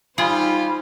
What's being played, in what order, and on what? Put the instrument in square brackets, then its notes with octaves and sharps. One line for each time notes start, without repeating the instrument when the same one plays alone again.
[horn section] G3 F4 [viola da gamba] D#4 C5 [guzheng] G#4 [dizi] B5